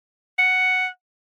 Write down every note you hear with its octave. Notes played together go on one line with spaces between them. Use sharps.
F#5